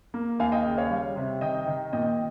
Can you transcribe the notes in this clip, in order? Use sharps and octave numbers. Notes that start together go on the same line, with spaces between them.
A#3
D#2 F5 G#5
D#5 G5
C#3
C#5 F5
G3
C3
D#3 D#5 G5
D#3
A#2 D#5 G5